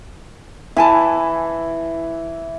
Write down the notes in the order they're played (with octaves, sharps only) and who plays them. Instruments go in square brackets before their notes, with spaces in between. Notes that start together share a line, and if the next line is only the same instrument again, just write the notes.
[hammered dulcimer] E3 [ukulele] E4 G#5 A5